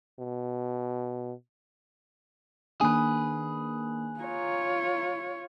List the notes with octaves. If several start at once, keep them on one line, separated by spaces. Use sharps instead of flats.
B2
D#3 A#3 D4 G#4 B4
F4 C#5 A#5